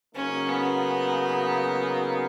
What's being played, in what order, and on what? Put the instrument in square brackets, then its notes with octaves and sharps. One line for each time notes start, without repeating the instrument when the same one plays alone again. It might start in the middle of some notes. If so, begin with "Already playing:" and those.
[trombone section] C#3 F#3 A#3 D#4 [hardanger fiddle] C#4
[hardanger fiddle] B3